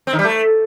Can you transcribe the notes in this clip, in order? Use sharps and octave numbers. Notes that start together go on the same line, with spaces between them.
C4
D#3
G3
A3